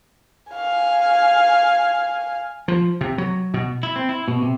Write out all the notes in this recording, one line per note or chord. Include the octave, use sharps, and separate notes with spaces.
F5 G#5
F3
C3
F#3
B2
E4
C4
E4
B2
C3